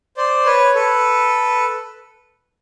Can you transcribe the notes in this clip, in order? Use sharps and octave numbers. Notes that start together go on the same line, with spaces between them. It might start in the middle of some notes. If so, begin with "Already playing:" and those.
C5 D5
B4 C#5
A4 B4